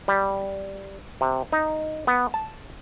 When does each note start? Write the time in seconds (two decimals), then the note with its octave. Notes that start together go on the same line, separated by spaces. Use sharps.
0.08 G3
1.21 C3
1.52 D#4
2.07 B3
2.34 A5